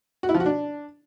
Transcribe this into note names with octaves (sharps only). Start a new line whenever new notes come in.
F#4
E4
F3
F#4
D4